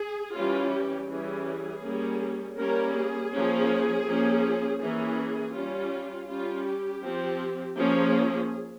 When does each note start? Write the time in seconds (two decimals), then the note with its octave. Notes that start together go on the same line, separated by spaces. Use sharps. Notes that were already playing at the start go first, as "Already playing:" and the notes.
Already playing: G#4
0.35 E3 G3 C#4 F4
0.73 G4
1.09 E3 G3 C#4 G#4
1.84 G3 A#3 C#4
2.57 G3 A#3 C#4 A#4
2.94 G#4
3.32 F3 A#3 C#4
4.06 F3 A#3 C#4
4.80 E3 A#3 C#4 G#4
5.54 G3 C#4 F4
6.28 G3 C#4 F4
6.66 G4
7.03 F3 C4
7.76 F3 A#3 C#4 G#4